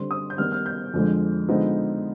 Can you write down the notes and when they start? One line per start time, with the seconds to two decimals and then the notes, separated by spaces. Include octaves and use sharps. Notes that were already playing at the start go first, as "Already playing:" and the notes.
Already playing: D3 G3 C4 C6
0.11 D#6
0.30 G6
0.38 D#3 G3 B3 F6
0.52 F6
0.66 G6
0.94 F2 D3 F3 G#3
1.49 D3 F3 G#3 B3 D#4